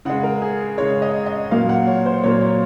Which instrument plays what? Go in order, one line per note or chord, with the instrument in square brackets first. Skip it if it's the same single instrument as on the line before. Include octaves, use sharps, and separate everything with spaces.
[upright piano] C#3 G#3 F#5
A#4
G#4
C#3 G#3 C#5
D#5
D#5
A#2 F#3 A#3 F5
F#5
C#5
C5
A#2 F#3 A#3 C#5
C#5